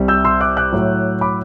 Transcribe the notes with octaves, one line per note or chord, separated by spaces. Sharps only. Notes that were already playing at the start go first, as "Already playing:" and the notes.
Already playing: C2 C3 G3
E6 G6
C6 E6
D6 F#6
D6 F#6
A2 F#3
B5 D6